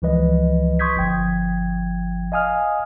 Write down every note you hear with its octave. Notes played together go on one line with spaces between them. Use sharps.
C#2 E3 F3 B4 D#5
C6 C#6 D#6 G6 G#6 B6
G1 F3 G5 G#6
D#5 F5 G#5 D#6 F6